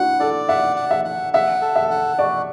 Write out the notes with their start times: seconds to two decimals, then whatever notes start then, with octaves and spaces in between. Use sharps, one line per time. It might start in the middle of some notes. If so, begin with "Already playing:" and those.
Already playing: D4 E4 F#4 F#5
0.20 A4 D5
0.48 E5 F#5
0.76 F#5
0.91 E5
1.05 F#5
1.33 E5 F#5
1.61 A4
1.76 E5
1.91 F#5
2.19 F#4 D5